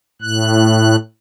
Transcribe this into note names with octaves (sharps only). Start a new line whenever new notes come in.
A2 F#6